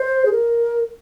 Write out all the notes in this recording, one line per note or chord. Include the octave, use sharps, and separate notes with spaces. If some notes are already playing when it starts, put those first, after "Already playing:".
Already playing: C5
G#4
A#4